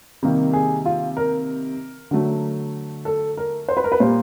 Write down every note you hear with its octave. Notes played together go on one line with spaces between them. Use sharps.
C3 D#3 G3 A#3
G#4
F4
A#4
D3 F#3 A3
A4
A#4
C5
B4
A#4
B4
A#2 G3 A#3 C5